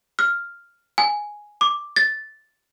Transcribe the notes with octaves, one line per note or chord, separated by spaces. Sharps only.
F6
G#5
D6
A6